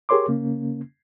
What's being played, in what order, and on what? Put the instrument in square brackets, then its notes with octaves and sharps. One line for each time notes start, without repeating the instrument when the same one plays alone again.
[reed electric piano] G4 G#4 A#4 C#5 C6 D6
C#3 A#3 C#4